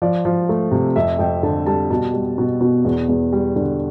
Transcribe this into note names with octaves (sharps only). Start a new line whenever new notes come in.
F3 D5
F3
A3
C3
F2 E5
F2 G5
D3 A5
G3 A5
B2 A5
G3
B2
B2
E2
E2
G3
D3